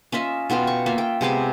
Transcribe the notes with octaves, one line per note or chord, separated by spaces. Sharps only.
C#4 F4 D#5 E5
B2 B3 F4 G5
C#6
A#3 F4 E5
G5
C3 G#3 B3 D6